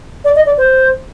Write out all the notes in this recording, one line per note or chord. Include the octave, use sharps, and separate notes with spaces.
D5
D#5
D5
C5